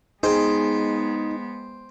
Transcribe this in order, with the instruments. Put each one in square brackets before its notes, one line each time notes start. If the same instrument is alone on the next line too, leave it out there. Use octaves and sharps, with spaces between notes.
[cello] G#3 B3 [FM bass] D#4 [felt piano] G#4 [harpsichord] C5 G5